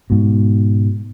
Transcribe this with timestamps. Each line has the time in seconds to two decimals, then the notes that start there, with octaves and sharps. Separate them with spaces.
0.10 G#2 B2